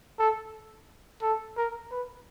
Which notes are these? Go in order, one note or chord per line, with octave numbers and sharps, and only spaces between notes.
A4
A4
A#4
B4